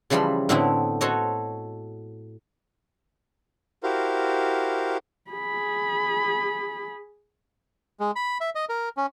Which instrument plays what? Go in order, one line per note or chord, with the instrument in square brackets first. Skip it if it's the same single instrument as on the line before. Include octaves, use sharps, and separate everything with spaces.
[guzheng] C#3 E3 F3 G3 B5 C6
A2 D3 A3 B3 C4 E4
F#4 A4 C5 C#5 D#5
[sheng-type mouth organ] E4 F#4 G4 A#4 C5 F5
[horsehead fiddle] G#4 B5
[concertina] G#3
B5
E5
D#5
A#4
C#4